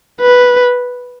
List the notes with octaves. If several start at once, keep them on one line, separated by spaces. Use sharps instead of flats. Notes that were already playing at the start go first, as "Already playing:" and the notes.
B4